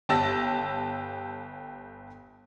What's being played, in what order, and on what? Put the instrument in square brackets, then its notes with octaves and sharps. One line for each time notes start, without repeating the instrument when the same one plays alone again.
[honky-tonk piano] G1 G4 A5 E6 A#6